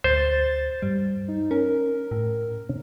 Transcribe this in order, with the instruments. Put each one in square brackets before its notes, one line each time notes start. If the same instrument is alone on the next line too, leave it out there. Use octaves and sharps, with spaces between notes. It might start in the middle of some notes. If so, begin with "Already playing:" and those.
[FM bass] D2 [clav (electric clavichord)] C5 [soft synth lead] A6
[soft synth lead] G2 [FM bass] G3
[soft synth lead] D#4
[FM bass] C#4 [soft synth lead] A#4
[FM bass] A2